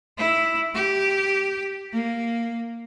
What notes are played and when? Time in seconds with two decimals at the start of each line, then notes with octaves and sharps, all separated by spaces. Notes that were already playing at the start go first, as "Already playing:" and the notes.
0.18 E4
0.74 G4
1.92 A#3